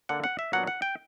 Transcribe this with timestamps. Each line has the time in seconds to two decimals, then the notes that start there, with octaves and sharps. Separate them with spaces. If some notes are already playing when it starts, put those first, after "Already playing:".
0.09 D3 A#3 D4 F#5
0.24 F#5
0.39 E5
0.53 A#2 F#3 B3 D4 F#5
0.67 F#5
0.82 G5